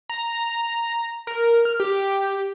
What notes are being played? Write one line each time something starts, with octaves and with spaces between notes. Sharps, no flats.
A#5
A#4
F6
G4